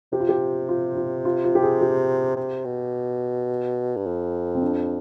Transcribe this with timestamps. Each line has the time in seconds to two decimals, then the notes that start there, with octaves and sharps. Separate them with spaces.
0.13 C3 G4
0.20 F4
0.29 G4
0.69 F4
0.97 F4
1.25 F4
1.44 F4
1.55 G4
1.63 G#4
1.81 G4
2.37 C3
2.65 B2
3.97 G2
4.06 F2
4.55 C4
4.62 D4